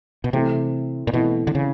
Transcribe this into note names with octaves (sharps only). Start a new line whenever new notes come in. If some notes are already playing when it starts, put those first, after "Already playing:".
B2
C3 E3 A3 C4 E4
A#2
B2 E3 A3 C4 E4
D3
C#3